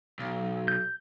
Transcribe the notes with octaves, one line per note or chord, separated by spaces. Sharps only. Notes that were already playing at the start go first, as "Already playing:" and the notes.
B1
G6